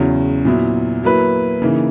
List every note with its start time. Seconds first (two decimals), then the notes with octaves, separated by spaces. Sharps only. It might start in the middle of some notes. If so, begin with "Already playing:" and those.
Already playing: E2 C#3 F#3 C#4
0.45 A#2 F#3 B3 E4
1.03 F#3 A#3 E4 B4
1.62 C#3 E3 A#3 D#4